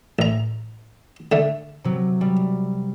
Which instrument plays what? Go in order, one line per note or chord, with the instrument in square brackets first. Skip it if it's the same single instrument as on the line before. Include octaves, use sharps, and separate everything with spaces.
[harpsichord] A1 A#5
D3 A3
[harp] C3 F#3
G3